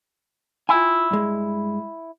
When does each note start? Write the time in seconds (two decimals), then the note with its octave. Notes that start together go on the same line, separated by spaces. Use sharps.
0.69 E4 F4 G5 G#5
1.11 G2 G#3